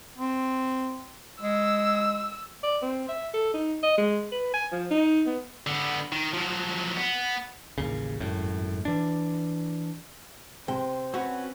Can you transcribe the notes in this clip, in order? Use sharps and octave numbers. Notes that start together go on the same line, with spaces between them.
C4
G#3 E6
D5
C4
E5
A4
D#4
D#5
G#3
B4
G#5
F3
D#4
B3
D3 B3
D#3
F3 F#3
B3
A1 D#2 C#3
G#1 F#2 A2
E3 D4
C3 C5 G5
C4 C#4 F#4 B4 C#5